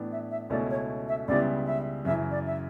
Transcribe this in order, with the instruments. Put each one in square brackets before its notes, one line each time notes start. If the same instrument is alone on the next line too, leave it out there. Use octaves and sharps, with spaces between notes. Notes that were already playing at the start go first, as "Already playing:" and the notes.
Already playing: [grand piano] A2 E3 B3 D4
[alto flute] E5
E5
[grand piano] C#2 B2 A3 C#4 E4 [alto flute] D5
[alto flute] C#5
E5
[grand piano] C#2 C#3 G3 B3 E4 [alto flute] D5
[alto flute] E5
[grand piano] F#2 C#3 E3 [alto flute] E5
[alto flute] D5
E5